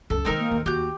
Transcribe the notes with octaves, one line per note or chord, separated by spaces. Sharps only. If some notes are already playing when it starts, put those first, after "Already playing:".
C#2 F#2 A4
D#3 G#3 C4 D#4 A#4
A#3
D#2
D#2 F#4 G4 G6